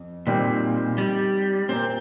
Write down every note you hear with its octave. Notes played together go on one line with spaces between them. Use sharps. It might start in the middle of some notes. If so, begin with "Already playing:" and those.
Already playing: F2
A#2 D#3 G3 C4
G3
A#2 A#3 C4 G4 A#4